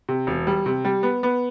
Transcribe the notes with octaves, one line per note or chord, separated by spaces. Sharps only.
C3
E1
G3
C3
G3
B3
B3